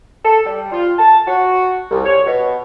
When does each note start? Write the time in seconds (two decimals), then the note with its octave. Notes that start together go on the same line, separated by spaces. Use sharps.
0.24 A4
0.45 G3
0.72 F4
0.98 A5
1.27 F#4
1.91 C2
2.05 C#5
2.27 B2